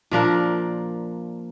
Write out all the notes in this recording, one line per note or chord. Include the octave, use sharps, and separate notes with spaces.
A#2 F3 D4 A#4